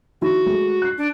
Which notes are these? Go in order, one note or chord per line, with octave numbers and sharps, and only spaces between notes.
D#3 F3 E4 F#4
G#3 A3
F#6 C7
D4